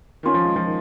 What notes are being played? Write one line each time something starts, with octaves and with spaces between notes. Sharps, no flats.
D#3 C#4 F4
F3
G#3
F3
D#3